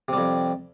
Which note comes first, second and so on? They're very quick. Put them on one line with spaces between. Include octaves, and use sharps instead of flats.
C3 G3 F2